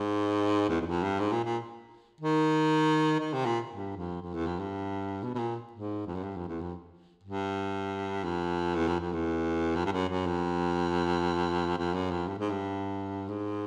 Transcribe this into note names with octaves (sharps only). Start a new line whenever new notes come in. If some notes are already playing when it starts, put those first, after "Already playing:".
Already playing: G#2
E2
E2
F2
G2
G#2
A#2
A#2
D#3
D#3
C3
A#2
G2
F2
F2
E2
F2
G2
B2
B2
A#2
G#2
F2
F#2
G2
F2
E2
F2
G2
F2
E2
F2
F2
E2
F2
G2
F#2
F#2
F2
F2
F#2
F2
G2
G#2
G2
G#2